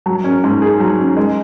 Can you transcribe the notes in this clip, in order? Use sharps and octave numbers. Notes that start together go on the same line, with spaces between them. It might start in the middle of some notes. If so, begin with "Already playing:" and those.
F#3
C#4
G#2
G#4
F#3
C#4
G#3